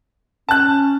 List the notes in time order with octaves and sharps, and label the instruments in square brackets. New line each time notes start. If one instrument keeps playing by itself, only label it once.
[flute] C#4 [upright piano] A5 F#6